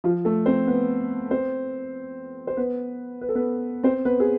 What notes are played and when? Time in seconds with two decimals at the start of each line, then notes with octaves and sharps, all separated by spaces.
0.04 F3 F4
0.25 A3 A4
0.46 C4 C5
0.67 B3 B4
1.31 C4 C5
2.47 C5
2.57 B3 B4
3.21 B4
3.29 A4
3.35 B3 B4
3.84 C4 C5
4.05 B3 B4
4.20 G#4